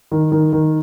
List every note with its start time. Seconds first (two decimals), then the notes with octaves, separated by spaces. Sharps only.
0.12 D#3
0.32 D#3
0.53 D#3